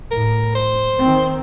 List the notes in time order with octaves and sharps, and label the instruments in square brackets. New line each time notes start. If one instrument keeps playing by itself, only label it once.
[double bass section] A2 [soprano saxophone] A#4
[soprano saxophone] C5
[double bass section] D#3 C4